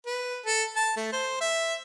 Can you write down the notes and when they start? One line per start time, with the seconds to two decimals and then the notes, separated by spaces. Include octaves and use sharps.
0.06 B4
0.45 A4
0.76 A5
0.96 A3
1.12 C5
1.41 E5